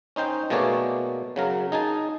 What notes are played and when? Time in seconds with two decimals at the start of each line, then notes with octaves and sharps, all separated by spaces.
0.16 C#4 D#4 C5 G5
0.50 B2 A3 A#3 G#4 C#5 D5
1.36 C#3 F#3 A#4
1.72 D#4 G#4 G#5 A5